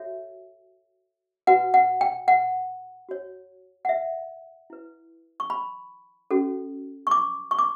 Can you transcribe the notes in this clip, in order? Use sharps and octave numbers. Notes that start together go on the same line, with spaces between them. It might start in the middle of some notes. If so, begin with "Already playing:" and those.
Already playing: F#4 A4 C#5 E5
F#4 B4 F#5
F#5
G5
F#5
F#4 C#5
F#5
E5
E4 B4
C#6
B5
C#4 F#4 A4
C#6
D6
C#6
D6